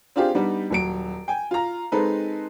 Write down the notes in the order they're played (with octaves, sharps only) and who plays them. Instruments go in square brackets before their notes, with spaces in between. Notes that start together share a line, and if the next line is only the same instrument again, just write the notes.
[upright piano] C4 D4 F4 G4 G#4
G3 B3 D4 D#4
D#1 F#3 D7
G5 G#5
F4 A#5
G#3 C4 D#4 A4 B4